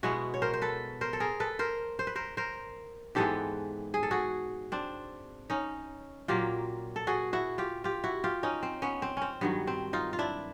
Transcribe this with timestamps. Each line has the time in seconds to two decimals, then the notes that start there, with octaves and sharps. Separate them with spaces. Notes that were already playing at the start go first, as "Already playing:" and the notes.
0.03 B2 G#3 B3 E4 F#4
0.34 C#5
0.42 A#4 C5
0.53 C5
0.62 A4 B4
1.01 A#4 C5
1.13 A4
1.20 G#4 A#4
1.40 A4 B4
1.59 A#4 C5
1.99 C5
2.07 B4
2.15 A#4 C5
2.37 A#4 C5
3.15 G#2 E3 G#3 B3 G4 A4
3.94 G#4
4.03 A4
4.11 F#4 G#4
4.72 C4 D4
5.50 C#4 D#4
6.28 A#2 F#3 A#3 F4 G4
6.96 A4
7.07 F#4 G#4
7.33 E4 F#4
7.58 F4 G4
7.84 F4 G4
8.04 E4 F#4
8.24 F4 G4
8.43 C#4 D#4
8.63 C4
8.82 B3 C#4
9.02 C4
9.17 C4 C#4
9.41 G2 D#3 F#3 B3
9.67 C4
9.93 D#4 F4
10.13 F4
10.19 D4 E4